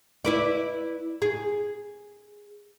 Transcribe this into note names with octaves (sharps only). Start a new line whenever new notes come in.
E4 B4 D5
G#4